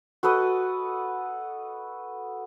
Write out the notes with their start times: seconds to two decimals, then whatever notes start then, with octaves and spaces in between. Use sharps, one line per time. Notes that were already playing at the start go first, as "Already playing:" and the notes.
0.23 F#4 A4 B4 D#5